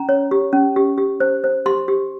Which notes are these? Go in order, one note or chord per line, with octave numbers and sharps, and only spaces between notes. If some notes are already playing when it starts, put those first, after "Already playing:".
Already playing: C#4 A#5
C#5
G4
C#4
G4
G4
C5
C5
G4 C6
G4